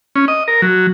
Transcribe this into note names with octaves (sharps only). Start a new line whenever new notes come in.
C#4
D#5
A#4
F#3